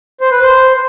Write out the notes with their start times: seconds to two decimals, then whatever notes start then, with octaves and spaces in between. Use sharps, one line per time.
0.21 C5
0.32 B4
0.42 C5